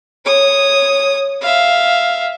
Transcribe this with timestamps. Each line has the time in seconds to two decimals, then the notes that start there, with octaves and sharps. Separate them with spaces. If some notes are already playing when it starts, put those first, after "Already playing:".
0.25 C#5 D#6
1.42 E5 F5